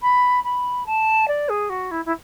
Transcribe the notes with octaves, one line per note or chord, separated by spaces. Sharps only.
B5
B5
A5
D5
G#4
F#4
E4
E4